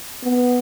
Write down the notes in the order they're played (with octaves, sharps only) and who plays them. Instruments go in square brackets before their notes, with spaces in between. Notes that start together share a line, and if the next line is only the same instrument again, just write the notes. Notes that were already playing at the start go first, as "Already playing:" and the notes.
[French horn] B3